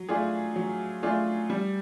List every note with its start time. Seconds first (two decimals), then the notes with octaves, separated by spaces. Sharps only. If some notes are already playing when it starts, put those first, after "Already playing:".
Already playing: F#3
0.09 A3 D4 F4 G#4
0.56 F#3
1.03 A3 D4 F4 G#4
1.50 G3